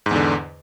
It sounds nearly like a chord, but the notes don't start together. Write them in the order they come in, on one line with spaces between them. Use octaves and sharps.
G#2 E2 D3